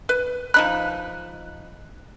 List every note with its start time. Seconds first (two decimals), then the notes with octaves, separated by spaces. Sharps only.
0.09 B4
0.54 F3 D#4 B5 F#6